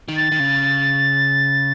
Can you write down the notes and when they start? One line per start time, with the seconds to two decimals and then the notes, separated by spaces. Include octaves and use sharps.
0.08 D#3
0.17 A6
0.32 D#3
0.40 C#3